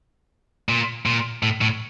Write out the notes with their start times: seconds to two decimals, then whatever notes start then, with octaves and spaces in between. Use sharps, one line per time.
0.69 A#2
1.06 A#2
1.43 A2
1.61 A2